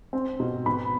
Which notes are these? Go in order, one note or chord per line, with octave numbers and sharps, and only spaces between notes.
C4
B2
B3 B5